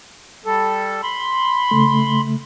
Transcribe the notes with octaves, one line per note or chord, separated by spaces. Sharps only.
G3 A4
B5 C6
C#3 A3